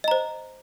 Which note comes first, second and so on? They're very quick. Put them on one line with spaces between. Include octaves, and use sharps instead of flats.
D#5 A#5 C5